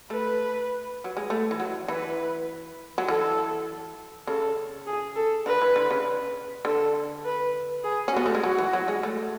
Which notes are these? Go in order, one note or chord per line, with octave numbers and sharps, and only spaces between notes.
A3 B4
F#3
G#3
A3
E3
F#3
E3 B4
F#3
E3 A4
C#3 A4
G#4
A4
D3 B4
E3
D3
C#3
D3 A4
B4
G#4
C#4
B3 F#4
A3
G#3
F#3 F#4
E3
F#3
G#3
A3